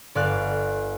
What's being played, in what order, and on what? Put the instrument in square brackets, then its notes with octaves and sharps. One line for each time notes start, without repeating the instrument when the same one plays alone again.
[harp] G1 D5 F5 F#6